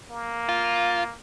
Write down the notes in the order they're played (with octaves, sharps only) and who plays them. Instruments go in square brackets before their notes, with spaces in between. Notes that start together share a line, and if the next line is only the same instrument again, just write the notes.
[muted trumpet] A#3
[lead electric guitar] F4